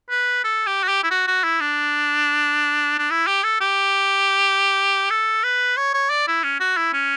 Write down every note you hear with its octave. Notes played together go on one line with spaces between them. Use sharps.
B4
A4
G4
F#4
G4
E4
F#4
F#4
E4
D4
D4
E4
G4
A4
G4
A4
B4
C#5
C#5
D5
E4
C#4
F#4
E4
C#4